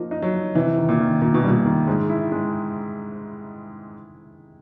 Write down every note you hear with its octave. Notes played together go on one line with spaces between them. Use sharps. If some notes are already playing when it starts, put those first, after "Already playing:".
Already playing: F3 A#3 D#4
D#4
F#3
D#4
C3 E3
D#3
A#2
D#3
A#2 D#3
B2
A#2 G3
D#3
G#2 G#3
E4
G#3